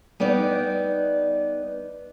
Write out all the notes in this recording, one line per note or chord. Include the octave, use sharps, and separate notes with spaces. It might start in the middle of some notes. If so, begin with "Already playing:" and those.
G3 B3 D#4 D5